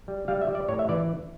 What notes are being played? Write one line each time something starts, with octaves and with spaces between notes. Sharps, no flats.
G3
G3 F5
E5
G3
D5
A2 C#5
E5
E3 D5